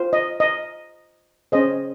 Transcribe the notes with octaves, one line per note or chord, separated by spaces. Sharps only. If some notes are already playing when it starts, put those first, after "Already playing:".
Already playing: F4 C5
D#5
D#5
C#4 G#4 C5 D#5